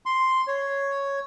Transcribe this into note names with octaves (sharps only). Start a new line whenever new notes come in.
C6
C#5